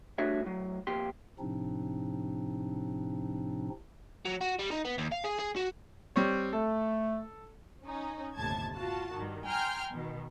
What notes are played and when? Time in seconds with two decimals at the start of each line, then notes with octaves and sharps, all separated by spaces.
0.18 G3 A3 D4 F#4 C#5 E5
0.43 A2 F#3
0.87 F2 A#2 G4 C6
1.39 A2 C3 F3 C4 D4 D#4
4.25 F#3
4.41 F#4
4.59 G3
4.71 D#4
4.85 B3
4.98 D#2
5.12 F5
5.24 G#4
5.39 G#4
5.56 F#4
6.16 G3 C4 C#5
6.53 A3 A4
7.84 C#4 D#4
8.37 G1 D#2 A2 C3 A5 G#6
8.75 F4 F#4 A5
9.13 G2 D#3
9.45 G5 G#5 A#5 C6 F6 G6
9.92 B2 D#3